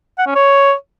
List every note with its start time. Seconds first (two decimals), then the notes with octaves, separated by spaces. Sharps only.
0.18 F#5
0.27 C#4
0.35 C#5